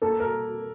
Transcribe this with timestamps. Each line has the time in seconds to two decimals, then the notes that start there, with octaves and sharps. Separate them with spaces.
0.02 A#3 A4
0.20 A#4